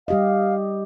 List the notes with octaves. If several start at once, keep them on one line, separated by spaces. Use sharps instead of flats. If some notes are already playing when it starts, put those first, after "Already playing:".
G3 G4 D#5 F5